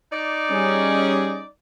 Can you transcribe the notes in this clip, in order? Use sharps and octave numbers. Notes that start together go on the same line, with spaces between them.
D#4 D5
G3 C#4 G#4